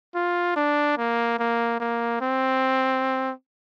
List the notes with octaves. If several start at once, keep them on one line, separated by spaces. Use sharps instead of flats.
F4
D4
A#3
A#3
A#3
C4